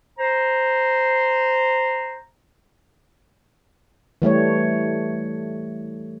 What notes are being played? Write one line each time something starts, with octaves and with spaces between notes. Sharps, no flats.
C5 A#5
E3 G3 A3 C#5